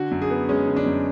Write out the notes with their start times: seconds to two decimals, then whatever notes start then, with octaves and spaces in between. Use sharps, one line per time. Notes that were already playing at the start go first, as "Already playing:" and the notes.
Already playing: D3 F#4
0.11 F#2
0.22 G#4
0.30 B3
0.49 G#3 C#4
0.67 D3
0.76 D4
0.86 F#2